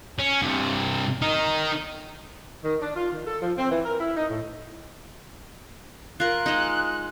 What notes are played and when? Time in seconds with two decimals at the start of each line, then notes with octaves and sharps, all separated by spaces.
0.19 C#4
0.42 G2 C3
1.22 D#4 A#4
2.64 D#3
2.81 D4
2.96 F4
3.13 D#3
3.27 A4
3.42 F3
3.58 C4
3.71 E3
3.85 A#4
4.00 E4
4.17 D#4
4.30 A2
6.20 F4 A#4 F#6
6.46 G#3 D#4